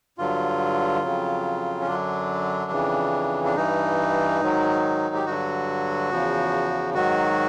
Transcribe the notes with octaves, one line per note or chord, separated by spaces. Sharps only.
G2 D3 F#3 F4
F2 C#3 F#3
C#4
F#2 D3 F#3 D4
F2 C#3 E3
D4
G2 E3 D#4
G#2 D#3 F#3
G4
G2 D3 F#3 F#4
E2 C#3 F3
G#2 D#3 F#3 F#4